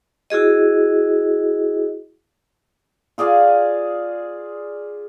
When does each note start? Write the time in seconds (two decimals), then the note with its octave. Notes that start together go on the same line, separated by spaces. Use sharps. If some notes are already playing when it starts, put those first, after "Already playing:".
0.30 E4 F#4 G#4 D#5
3.18 F4 G#4 D5 F5